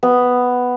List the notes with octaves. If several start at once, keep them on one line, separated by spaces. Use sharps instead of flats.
B3